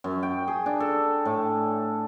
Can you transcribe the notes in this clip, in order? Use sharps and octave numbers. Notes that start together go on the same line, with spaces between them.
F#2
G5
G#4
D4
A4
A2